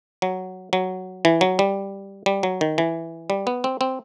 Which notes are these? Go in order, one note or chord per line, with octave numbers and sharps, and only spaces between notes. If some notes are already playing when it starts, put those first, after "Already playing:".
F#3
F#3
E3
F#3
G3
G3
F#3
D#3
E3
G3
B3
C4
C4